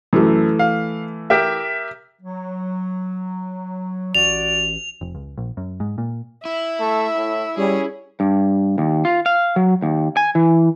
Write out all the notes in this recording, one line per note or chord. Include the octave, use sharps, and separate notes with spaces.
F#2 E3 A3
F5
G4 A#4 E5
F#3
A1 F#4 D5 F7
F1
C#2
A#1
F#2
G#2
A#2
E4 E5
A3
A2
G3 C#4 G#4
G2
D#2
F4
F5
F#3
D#2
G#5
E3